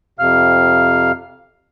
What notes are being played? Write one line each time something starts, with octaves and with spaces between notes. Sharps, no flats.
F2 C3 F5 F6